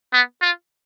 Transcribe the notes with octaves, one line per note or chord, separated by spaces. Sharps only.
B3
F4